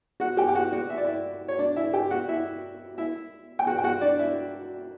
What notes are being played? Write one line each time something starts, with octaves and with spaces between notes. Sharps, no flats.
F#4 F#5
G4 G5
G5
F#4 F#5
F#4 F#5
E5
D5
E4 E5
C#5
D4 D5
E4 E5
G4 G5
F#4 F#5
E4 E5
E4 E5
G5
F#4 F#5
G5
F#4 F#5
D4 D5
E4 E5